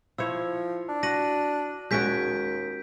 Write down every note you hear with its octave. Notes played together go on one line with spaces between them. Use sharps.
F3 E4 C5 C#5 E6
D4
F#4 A#6 D#7 F#7
D#2 G#3 C#4 F#4 G6 B6 D7